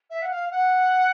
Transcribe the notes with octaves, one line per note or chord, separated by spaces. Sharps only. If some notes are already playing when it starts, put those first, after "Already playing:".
E5
F#5
F5
F#5